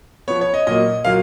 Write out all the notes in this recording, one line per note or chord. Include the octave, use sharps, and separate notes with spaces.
F3 B3 C#5
C#5
D#5
A#2 F#3 A#3 D#5
A#2 F#3 A#3 F5